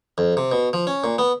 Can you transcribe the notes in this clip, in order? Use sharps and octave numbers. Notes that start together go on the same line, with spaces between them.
F2
C3
B2
F3
C#4
A#2
B3